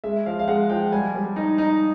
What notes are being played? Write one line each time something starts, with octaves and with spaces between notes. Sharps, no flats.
G#3 E5
F3 F5
F5
G#3 F#5
F3 G5
G3 G#5
G3
D#4
D#4